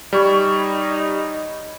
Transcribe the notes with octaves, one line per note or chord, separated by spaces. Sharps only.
G3 D#4 C#5 B5